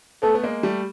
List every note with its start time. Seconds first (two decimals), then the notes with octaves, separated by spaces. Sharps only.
0.23 A3 B3 A4
0.34 B3
0.44 G#3 A#3
0.63 G3 A3